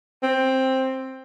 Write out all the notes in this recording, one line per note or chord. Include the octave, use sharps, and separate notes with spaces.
C4